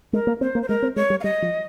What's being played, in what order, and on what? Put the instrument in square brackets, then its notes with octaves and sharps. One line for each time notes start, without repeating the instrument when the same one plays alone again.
[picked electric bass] G#3 [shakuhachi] A#4
[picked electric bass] A#3
[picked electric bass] C4 [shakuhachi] C5
[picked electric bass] A#3
[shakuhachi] C5
[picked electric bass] G#3 [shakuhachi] A#4
[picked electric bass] C4
[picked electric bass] G#3 [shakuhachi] C#5
[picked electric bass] G3
[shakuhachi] F5
[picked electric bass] G3 [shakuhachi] D#5
[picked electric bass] F3